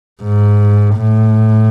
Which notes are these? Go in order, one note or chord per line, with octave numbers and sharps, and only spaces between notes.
G#2
A2